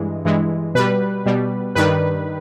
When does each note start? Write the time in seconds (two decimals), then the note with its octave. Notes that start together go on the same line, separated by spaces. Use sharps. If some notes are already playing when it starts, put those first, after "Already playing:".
Already playing: G2 E3 G#3
0.25 G2 E3 G#3
0.75 B2 G3 B4
1.26 B2 G3
1.75 G2 D#3 G3 B4